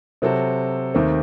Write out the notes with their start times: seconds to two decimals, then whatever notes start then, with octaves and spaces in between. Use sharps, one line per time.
0.22 C3 F#3 C4 F#4 A4
0.94 D#2 D#3 A3 C4